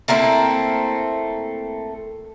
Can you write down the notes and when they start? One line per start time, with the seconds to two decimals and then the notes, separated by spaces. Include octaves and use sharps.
0.08 A3 A#3 C4 E4